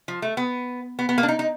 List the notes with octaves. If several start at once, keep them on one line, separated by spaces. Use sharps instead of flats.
F3
A3
B3
B3
B3
A#3
D4
D#4
D#4